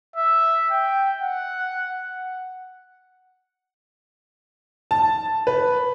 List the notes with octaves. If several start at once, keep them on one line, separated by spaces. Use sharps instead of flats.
E5
G5
F#5
A5
B4